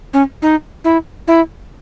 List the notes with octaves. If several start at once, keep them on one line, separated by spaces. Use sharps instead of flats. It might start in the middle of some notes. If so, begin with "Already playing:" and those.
C#4
D#4
E4
E4